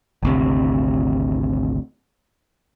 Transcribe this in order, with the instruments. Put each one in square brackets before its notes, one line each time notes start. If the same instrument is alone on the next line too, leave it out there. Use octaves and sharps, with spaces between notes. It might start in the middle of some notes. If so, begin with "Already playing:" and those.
[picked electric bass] G#1 D2 C3